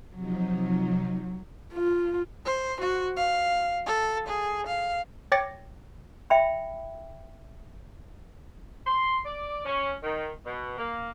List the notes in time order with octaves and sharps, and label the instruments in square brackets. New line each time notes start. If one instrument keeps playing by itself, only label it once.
[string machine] C3 F3 D#4 [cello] F#3
[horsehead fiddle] F4
[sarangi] C5
F#4
F5
A4
G#4
F5
[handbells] C#5 G5 D6 A6 A#6 C#7
[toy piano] E5 G5 B5
[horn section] C6
D5
C#4
D#3
B2
A#3